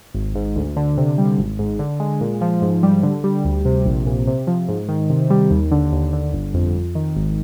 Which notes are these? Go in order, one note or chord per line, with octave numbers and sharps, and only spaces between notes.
G#1
G#2
D2
D3
C3
G3
G#1
G#2
D3
G#3
A#2
F3
G#2
G3
D3
G3
D2
C3
A#1
A#2
C3
F3
G#2
D#3
C3
G3
D#2
D3
D#2
D3
G1
F2
F2
D#3
G#1